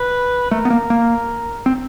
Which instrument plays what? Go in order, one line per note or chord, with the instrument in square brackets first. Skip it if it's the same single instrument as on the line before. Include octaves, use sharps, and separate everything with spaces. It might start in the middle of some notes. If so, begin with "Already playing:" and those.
Already playing: [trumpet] B4
[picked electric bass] A3 [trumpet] A#4
[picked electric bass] B3
A#3
A#3
C4